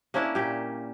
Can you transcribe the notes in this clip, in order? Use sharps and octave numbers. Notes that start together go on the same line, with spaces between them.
A#3 C#4 D4 E4
A#2 G4